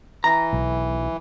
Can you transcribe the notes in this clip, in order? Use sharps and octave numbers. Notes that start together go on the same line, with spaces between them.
E3 A#5
B1